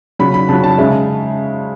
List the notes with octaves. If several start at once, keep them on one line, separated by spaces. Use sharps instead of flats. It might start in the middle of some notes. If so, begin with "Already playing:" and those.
C#3 F#3 B5
B5
C#3 F#3 A5
A5
C#3 G#3 E5